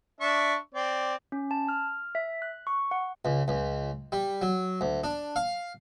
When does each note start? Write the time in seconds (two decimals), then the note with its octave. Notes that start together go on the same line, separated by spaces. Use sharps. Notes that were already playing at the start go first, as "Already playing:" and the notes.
0.20 D4 E5 C#6
0.74 C4 D5
1.32 C#4
1.51 A5
1.69 F6
2.15 E5
2.42 F#6
2.67 C#6
2.91 F#5
3.25 C#2
3.48 C#2
4.12 G3
4.42 F#3
4.81 D2
5.04 D4
5.36 F5